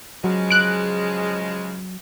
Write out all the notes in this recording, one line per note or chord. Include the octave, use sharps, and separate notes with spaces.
C#3 F3 F#3 G#3
F#6 D7